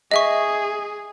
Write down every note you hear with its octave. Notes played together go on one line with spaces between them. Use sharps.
G#4 D#5 E5 C#6